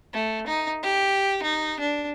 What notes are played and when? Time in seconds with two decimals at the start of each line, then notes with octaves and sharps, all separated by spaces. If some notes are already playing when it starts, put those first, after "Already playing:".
0.14 A3
0.47 D#4
0.83 G4
1.43 D#4
1.80 D4